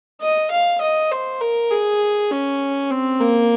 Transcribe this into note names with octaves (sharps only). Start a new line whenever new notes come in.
D#5
F5
D#5
C5
A#4
G#4
C#4
C4
A#3